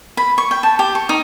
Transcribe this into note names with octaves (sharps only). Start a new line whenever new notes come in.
B5
C#6
G5
A5
G4
C#6
D#4